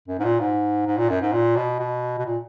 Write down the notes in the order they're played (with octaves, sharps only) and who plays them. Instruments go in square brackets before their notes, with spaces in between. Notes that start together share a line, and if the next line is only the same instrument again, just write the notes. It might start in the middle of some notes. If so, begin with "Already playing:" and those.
[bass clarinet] F#2
G#2
A#2
G#2
G#2
A#2
F#2
G#2
A#2
B2
B2
B2
A#2